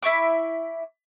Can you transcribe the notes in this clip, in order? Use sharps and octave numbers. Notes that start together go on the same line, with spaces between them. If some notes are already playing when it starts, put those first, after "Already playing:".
E4 E5 C#6 D6